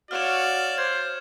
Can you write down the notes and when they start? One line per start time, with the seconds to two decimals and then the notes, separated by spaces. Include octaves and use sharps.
0.11 F#4 C#5 D5 F5 F6 E7
0.78 C5 G#6